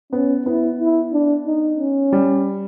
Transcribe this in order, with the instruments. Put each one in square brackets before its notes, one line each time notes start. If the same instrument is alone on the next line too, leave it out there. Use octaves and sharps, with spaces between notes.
[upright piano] B3 [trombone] C#4
[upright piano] B3 [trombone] E4
[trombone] E4
D4
D#4
C#4
[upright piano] G3